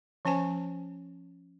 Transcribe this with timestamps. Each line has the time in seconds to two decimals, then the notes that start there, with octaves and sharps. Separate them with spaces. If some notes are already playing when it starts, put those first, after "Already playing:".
0.25 F3 C#4 C5 G#5 A5